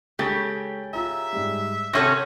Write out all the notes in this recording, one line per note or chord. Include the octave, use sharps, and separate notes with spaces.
C#3 G#3 G4 A4 A6
F4 E5 A#5
G#2 G3
C3 C#4 F#4 A4 C#5 D#6 G6 A#6